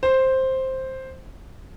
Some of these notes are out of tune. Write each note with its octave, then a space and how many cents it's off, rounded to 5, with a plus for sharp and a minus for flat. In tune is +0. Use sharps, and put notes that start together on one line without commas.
C5 +5